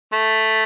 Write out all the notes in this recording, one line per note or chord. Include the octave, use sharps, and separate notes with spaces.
A3